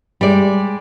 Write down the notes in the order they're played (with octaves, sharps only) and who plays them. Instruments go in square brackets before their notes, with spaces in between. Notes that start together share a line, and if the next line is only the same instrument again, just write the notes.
[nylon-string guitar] G3 G#3 D5